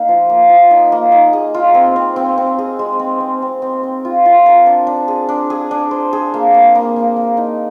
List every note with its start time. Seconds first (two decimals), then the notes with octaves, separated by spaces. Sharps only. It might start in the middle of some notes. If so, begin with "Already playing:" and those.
Already playing: A#3 D#4
0.08 F3
0.30 A#3
0.49 F3
0.71 D#4
0.92 A#3
1.12 D#4
1.33 G#4
1.54 F4
1.74 C4
1.96 C4
2.16 C4
2.38 C4
2.58 G#4
2.79 G#3
2.99 C4
3.20 C4
3.42 C4
3.62 C4
3.83 C4
4.05 F4
4.26 F4
4.46 A#4
4.66 D4
4.87 D4
5.08 G#4
5.29 D4
5.50 G#4
5.71 D4
5.91 C5
6.13 G#4
6.34 A#3
6.54 A#3
6.75 A#3
6.96 A#3
7.16 A#3
7.37 D#4